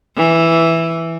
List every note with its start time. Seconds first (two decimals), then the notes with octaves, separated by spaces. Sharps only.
0.17 E3